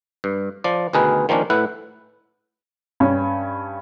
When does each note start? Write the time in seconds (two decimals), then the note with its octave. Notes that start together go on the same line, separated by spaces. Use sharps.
0.24 G2
0.64 F3 D5
0.93 D2 B2 D#3 G#4 A#4 B4
1.29 D#3 F3 A#3 C#4 D4
1.50 A2 E4 B4 F#5
3.00 G2 C#4